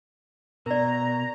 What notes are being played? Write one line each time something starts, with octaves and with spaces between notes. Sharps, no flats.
B2 A#4 D5 A#5